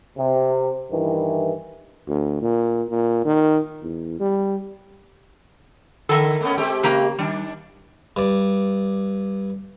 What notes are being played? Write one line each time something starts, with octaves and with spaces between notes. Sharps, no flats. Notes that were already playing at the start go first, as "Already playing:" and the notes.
C3
G2 D#3 E3
D2
A#2
A#2
D#3
E2
G3
D3 A4 A#4 E5
A3 B3 C#4
G#3 C4 G4
C#3 A#3 A#5
D#3 G3 D4
G2 D5